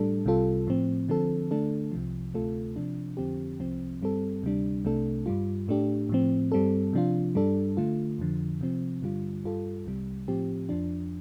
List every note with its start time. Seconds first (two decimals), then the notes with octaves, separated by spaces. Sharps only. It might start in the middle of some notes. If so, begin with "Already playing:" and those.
Already playing: A2 G3 D4 A4
0.26 C2 C3 G3 F4 A4
0.67 A2 F3 C4
1.09 D3 F3 C4 A4
1.51 D3 A3 D4 A4
1.92 C2 C3 F3
2.34 D2 C3 A3 F4 A4
2.76 C3 F3 D4
3.17 F2 D3 F3 C4 G4
3.59 C2 C3 F3 C4
4.01 G2 G3 C4 A4
4.43 D2 C3 G3 D4
4.85 C2 C3 A3 D4 A4
5.26 G2 G3 F4
5.68 A2 A3 D4 G4
6.09 A2 F3 C4
6.52 G2 G3 C4 A4
6.93 C3 F3 D4 F4
7.35 G2 G3 D4 A4
7.77 D3 A3 F4
8.18 F2 D3 F3
8.61 C3 F3 C4
9.02 G2 D3 G3 F4
9.44 G2 G3 F4 A4
9.86 C2 C3 G3
10.28 A2 F3 C4 G4
10.69 F2 F3 D4